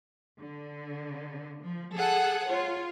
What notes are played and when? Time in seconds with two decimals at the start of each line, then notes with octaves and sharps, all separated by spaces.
0.38 D3
1.61 F3
1.94 G#4 A4 F#5
2.46 F4 C#5